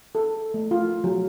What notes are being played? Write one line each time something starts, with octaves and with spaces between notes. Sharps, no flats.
A4
A3
F4
F#3